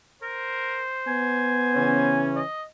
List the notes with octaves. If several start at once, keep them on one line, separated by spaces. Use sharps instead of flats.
A#4 C5
B3 G#5
C#3 E3 C#4
D#5